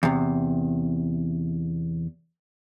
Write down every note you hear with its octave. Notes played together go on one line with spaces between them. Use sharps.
E2 C3